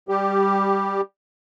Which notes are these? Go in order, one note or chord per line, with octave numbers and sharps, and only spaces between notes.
G3 G4